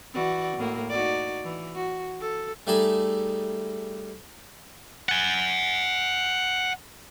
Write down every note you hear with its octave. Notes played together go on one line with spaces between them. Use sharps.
E3 F#4 D5
A2 A#3
D#4 F#4 D5
E3
F#4
A4
G3 A3 D#4 G#4 A4
F#5 G#5